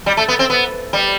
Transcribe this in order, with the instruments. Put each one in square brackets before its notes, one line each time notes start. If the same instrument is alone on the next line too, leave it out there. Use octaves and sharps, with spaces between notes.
[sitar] G3
A3
B3
C4
B3
G3